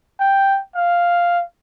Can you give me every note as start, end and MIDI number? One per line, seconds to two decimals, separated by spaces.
0.20 0.60 79
0.75 1.43 77